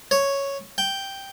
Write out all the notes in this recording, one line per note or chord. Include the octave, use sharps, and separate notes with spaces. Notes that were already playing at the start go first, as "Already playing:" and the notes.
C#5
G5